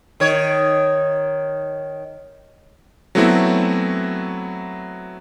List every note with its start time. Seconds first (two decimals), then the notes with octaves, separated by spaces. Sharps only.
0.20 D#3 C#5
3.15 F#3 A3 B3 C4 E4 F#4